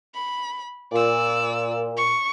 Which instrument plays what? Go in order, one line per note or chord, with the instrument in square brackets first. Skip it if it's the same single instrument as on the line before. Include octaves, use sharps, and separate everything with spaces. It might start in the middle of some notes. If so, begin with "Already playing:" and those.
[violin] B5
[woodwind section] A#2 [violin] D5 E6
[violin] C#6